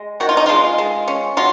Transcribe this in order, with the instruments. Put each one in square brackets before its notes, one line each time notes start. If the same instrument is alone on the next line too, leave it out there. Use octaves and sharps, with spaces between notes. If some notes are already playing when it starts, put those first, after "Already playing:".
Already playing: [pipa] G#3
D#3 F#4
F4
D#4
G#3 F4
G#3
C#4
F#3 F4